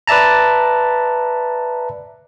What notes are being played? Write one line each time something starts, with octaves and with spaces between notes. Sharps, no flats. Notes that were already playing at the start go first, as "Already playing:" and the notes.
B4 D5 E5 A5 A#5